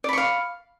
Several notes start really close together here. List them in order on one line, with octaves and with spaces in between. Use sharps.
D5 B5 C#6 F5